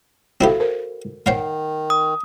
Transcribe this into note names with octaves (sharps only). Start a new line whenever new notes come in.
C4 E4 F#4 G4 A4 F5
A#4 C5
D#3 C5 C#5 F5 F#5
D#6